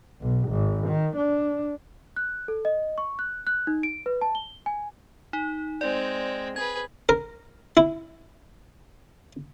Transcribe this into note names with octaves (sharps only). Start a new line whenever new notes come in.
B1
G#1
D#3
D4
F#6
A4
D#5
C#6
F#6
F#6
D#4
D7
B4
A5
G7
G#5
D#4
G#3 C4 D5
G#4 B4 G#6
A#4
E4